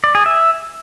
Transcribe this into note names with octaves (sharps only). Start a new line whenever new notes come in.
D5
G#4
E5